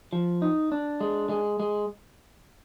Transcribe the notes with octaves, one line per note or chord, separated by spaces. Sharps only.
F3
D#4
D4
G#3
G#3
G#3